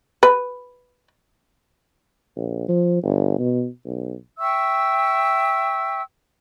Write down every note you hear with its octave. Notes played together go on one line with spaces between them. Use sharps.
B4
A#1
F3
G1
B2
B1
E5 G5 C#6 E6